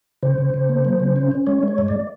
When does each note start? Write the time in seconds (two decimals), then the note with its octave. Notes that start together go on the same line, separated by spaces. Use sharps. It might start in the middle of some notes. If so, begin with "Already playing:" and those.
0.23 C#3 C5
0.38 C#3
0.54 C#3
0.69 A#3
0.85 F#3
1.00 C#3
1.16 C#4
1.32 C#4
1.47 G#3 C#5
1.63 G#3 C#5
1.78 G2
1.88 D5